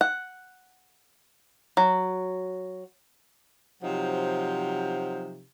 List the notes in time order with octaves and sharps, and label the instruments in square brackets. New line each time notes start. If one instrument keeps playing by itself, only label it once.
[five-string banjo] F#5
F#3
[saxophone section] C3 F3 F#3 D#4